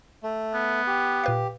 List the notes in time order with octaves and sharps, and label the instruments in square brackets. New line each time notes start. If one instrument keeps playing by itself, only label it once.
[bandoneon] A3
[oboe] B3
[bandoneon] G4
[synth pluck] A#2 B4 F5